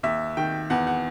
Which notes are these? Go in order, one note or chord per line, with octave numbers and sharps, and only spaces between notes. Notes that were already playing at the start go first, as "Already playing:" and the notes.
D#2 E5
D#3 G5
E2 F#5
F#5